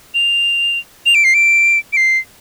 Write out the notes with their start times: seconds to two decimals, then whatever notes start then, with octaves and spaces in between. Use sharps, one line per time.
0.14 F7
1.06 F7
1.15 D7
1.24 C7
1.34 D7
1.93 D7
1.97 C7